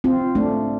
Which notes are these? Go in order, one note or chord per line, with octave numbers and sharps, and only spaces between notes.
C4 F4
A3 D4